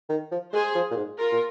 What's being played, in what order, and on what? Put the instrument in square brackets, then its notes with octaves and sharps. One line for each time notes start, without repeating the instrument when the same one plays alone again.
[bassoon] D#3
F3
[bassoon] G#3 [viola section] G#4 C5
[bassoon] F3
A#2
G#2
[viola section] F4 A#4
[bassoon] A#2